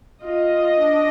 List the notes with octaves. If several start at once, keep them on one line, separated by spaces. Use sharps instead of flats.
F4 D#5
D4